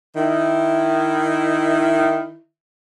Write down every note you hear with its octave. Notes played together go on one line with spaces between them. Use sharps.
D#3 E4